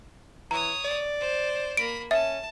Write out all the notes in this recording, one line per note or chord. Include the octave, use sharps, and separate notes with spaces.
E3 C#5 A#5 D#6
D5
C5
A#3 B5 D7
C#4 E5 A5